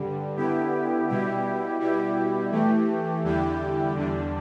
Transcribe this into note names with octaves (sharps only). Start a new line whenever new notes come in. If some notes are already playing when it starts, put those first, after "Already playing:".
Already playing: G2 D3 G3
D3 B3 E4 G4
B2 G3 E4 G4
B2 G3 E4 G4
E3 A3 G4
E2 D3 G3 E4 G4
E2 D3 G3 D4